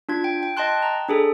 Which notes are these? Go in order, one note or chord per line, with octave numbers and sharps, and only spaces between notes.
D4 F4 G#6
G5
G5
D#5 G5 A5 C6 F#6
A#5
D4 G#4 A4